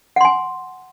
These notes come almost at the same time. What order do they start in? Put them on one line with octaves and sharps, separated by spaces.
F#5 C6 G#5